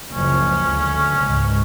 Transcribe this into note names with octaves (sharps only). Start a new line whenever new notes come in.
F#1 C#2 F3 C#4
D2
C#2 G#2